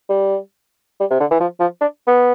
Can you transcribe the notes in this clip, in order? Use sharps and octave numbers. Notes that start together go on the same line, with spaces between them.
G3
G3
C3
D3
E3
F3
F3
D4
B3